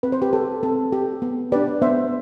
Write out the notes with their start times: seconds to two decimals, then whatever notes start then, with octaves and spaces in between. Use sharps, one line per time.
0.03 C4 B4
0.12 C5
0.22 G4 B4
0.33 G4 A4
0.63 C4 A4
0.92 G4
1.22 B3
1.52 D4 G4 B4 D5
1.82 B3 C5 E5